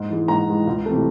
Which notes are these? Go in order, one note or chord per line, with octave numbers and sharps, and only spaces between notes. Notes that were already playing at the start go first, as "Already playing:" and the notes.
Already playing: G#2
E3 G#3
G#2 A#5
E3 G#3
C#2
C3 E3 A3